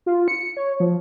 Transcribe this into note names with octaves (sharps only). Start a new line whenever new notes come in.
F4
C#7
C#5
F3